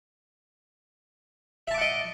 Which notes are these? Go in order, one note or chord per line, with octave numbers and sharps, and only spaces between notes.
D#5 E5 F#5 A5 D6